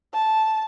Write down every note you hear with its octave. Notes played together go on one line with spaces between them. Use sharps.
A5